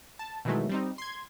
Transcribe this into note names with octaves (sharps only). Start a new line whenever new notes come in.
A5
B2 D#3 E3 F#3 G#3 A3
G3 C4 D#4
C6 G#6